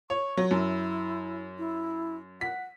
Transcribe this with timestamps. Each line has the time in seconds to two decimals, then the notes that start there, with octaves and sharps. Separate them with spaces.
0.10 C#5 C#6
0.37 F#3
0.51 F#2 E4
1.58 E4
2.41 F#5 B6